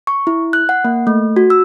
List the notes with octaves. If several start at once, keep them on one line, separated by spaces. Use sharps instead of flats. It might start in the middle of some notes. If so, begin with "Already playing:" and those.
C#6
E4
F#6
F#5
A#3
A3
F#4
E6